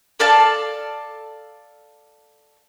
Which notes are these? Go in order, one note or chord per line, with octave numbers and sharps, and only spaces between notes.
A4 D5 F5 A5